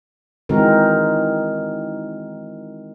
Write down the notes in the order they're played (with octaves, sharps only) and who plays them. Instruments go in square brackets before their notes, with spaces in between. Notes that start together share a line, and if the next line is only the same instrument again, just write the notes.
[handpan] D#3 E3 G#3 C4 F#4 A#4